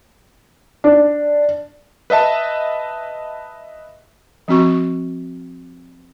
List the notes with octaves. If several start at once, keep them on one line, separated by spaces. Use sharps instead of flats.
D4
B4 D#5 E5 A5
F3 C4 F#4 C#6